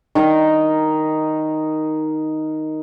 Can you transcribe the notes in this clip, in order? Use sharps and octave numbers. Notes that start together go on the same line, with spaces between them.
D#3 D#4 A#4 D#5